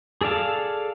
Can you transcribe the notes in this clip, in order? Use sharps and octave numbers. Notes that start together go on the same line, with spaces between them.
G#4 A4 D5 F5 A5